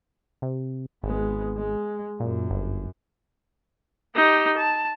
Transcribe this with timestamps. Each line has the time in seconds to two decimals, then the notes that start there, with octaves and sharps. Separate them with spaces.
0.42 C3
1.04 G#1 G#3 B3
1.58 G#3
2.20 F#2 A#2
2.51 G1
4.15 D#4 G4
4.57 A5